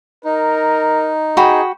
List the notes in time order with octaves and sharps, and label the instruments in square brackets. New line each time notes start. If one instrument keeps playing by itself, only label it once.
[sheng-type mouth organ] D#4 [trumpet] A#4
[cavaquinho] F#4 G5 B5 [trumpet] G#4